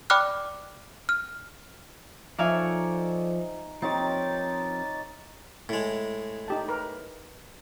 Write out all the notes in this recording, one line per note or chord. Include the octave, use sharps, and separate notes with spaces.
D5 G5 B5 D6 F6 F#6
F6
F3 D#4 A4 C#5 D5 E5 F5 G#5
F3 C4 D#4 G4 A#4 C#5 A6
A2 G#3
D#4 G4 A5
A#4 B4